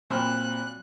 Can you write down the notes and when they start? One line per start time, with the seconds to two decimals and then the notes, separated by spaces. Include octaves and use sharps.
0.10 A#2 F#3 C4 B5 F#6